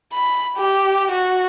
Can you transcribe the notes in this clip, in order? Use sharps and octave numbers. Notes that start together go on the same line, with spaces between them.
B5
G4
F#4